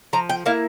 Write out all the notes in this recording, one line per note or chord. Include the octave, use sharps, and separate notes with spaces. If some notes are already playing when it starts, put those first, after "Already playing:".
F3 A#5
G5
A#3 E4 F5